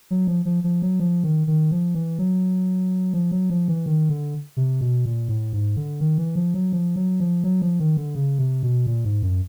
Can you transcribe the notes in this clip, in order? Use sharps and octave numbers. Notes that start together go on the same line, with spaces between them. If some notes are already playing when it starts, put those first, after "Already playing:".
F#3
F3
F3
F3
F#3
F3
D#3
D#3
F3
E3
F#3
F3
F#3
F3
E3
D#3
D3
C3
B2
A#2
A2
G#2
D3
D#3
E3
F3
F#3
F3
F#3
F3
F#3
F3
D#3
D3
C#3
C3
B2
A#2
G#2
F#2